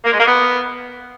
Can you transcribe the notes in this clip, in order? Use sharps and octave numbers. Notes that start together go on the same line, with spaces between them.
A#3
G#3
A#3
B3